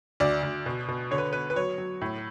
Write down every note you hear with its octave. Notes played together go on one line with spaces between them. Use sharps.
D2 D5
D2
B2
B2
D3 C#5
B4
B3 B4
B4
F#3 C#5
F#3
A2